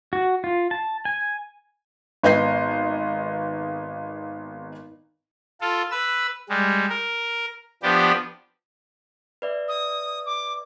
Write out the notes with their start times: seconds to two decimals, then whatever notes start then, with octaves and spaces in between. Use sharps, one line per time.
0.13 F#4
0.44 F4
0.71 A5
1.05 G#5
2.23 G#1 B3 B4 D#5 G6 C7
5.61 F4 A4
5.91 B4 E6
6.49 G3 G#3
6.89 A#4
7.83 F3 B3 D4 G4
9.42 B4 D5 E5
9.68 D#6
10.26 D6